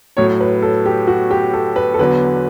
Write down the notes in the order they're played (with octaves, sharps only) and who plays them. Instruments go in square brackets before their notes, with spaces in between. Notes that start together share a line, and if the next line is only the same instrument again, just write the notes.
[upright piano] A2 F#3 C#5
B4
A4
G4
F#4
G4
A4
B4
A4
E2 D3 F#3 B4